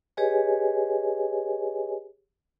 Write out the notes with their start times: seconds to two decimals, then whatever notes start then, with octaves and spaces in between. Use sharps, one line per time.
0.17 G4 G#4 B4 C#5 D#5 G#5